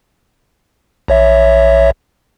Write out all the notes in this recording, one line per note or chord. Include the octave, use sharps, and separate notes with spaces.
A#1 C#5 E5